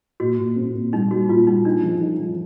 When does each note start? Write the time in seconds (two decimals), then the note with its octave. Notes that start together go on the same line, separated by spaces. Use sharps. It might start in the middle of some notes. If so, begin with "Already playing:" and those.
0.20 A#2 F#4
0.38 A#2
0.56 C4
0.74 A#2
0.93 G3 D#4
1.11 G3 F#4
1.29 A#2 F4
1.47 G3 D#4
1.65 D4 D#4
1.83 F3
2.01 D#4
2.20 F3